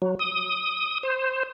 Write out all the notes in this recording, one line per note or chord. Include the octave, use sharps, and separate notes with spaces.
F#3
D#6
C5